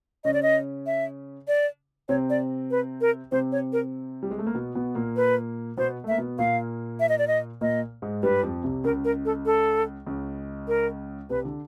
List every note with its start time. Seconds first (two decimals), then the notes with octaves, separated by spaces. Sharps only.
0.24 C#3 C#4 D#5
0.34 D5
0.43 D#5
0.86 E5
1.48 D5
2.09 C3 C4 C#5
2.30 D5
2.71 B4
3.01 A#4
3.32 C3 C4 C5
3.52 C#5
3.73 A#4
4.23 G3
4.31 G#3
4.39 A3
4.47 A#3
4.54 B2 B3
4.75 B2 B3
4.95 A#2 A#3
5.16 B4
5.77 B2 B3 C5
6.04 A3
6.08 A#3 E5
6.18 B2 B3
6.39 A#2 A#3 F5
7.00 E5
7.09 D#5
7.18 D5
7.28 D#5
7.61 A#2 A#3 D#5
8.02 G#2 G#3
8.23 G2 G3 B4
8.43 F2 F3
8.64 C2 C3
8.84 C#2 C#3 A#4
9.05 A#4
9.25 A4
9.46 A4
10.06 C#2 C#3
10.68 A#4
11.30 C2 C3 B4
11.45 D3